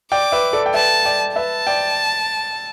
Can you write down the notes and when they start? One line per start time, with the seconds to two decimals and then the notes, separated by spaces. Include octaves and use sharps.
0.12 D5 G5 D6
0.32 B4 E5
0.53 A4 D5
0.66 G5
0.74 B4 E5 A5
1.05 D5 G5
1.36 B4 E5 A5
1.67 D5 G5